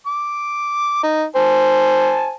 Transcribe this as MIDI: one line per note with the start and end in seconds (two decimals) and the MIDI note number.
0.07 1.03 86
1.03 1.24 63
1.36 2.36 72
1.36 2.36 80
1.36 2.36 81